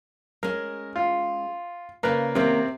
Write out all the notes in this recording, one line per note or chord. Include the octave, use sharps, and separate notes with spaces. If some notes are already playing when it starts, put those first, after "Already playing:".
G#3 C#4 A#4
F4
C#3 A#3 A#4 B4 D5
C3 D#3 A#3 C4 C#4 C5